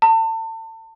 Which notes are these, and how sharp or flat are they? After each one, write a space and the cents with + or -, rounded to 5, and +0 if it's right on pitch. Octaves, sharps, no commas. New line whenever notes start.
A5 +35